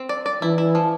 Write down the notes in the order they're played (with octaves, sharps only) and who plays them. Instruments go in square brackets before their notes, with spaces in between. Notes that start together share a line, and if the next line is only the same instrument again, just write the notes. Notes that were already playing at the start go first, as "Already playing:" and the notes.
Already playing: [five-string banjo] C4
D5
D5
[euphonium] E3 [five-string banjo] E4
[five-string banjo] E4
F3